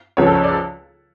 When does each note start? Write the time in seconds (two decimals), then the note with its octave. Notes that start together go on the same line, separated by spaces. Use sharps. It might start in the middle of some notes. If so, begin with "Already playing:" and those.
0.17 C#2 C#3 F3 C#5
0.26 A4
0.35 C#5
0.44 D5